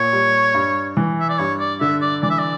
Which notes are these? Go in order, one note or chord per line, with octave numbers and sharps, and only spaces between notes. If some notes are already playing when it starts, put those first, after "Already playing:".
Already playing: A#2 C#5
G3
G2
E3
E5
D5
G2 C#5
D5
D3 E5
D5
E3 D5
E5
D5